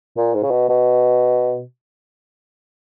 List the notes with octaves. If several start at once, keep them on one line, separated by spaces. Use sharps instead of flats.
A#2
G#2
C#3
B2
B2